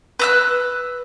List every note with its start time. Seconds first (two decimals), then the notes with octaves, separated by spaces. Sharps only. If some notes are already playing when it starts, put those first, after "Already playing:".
0.19 B4 E6 F#6